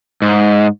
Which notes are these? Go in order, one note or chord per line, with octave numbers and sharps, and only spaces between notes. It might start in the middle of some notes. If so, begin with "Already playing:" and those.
G#2